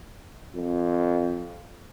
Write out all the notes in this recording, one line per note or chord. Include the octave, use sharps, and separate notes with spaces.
F2